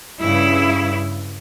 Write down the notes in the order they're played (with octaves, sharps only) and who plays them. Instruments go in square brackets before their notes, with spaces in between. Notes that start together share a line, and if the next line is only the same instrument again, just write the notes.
[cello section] G2 C#3 E4